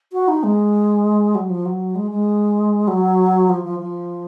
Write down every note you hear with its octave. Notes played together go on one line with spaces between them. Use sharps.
F#4
D#4
G#3
F#3
F3
F#3
G#3
G#3
F#3
F3
F3
F3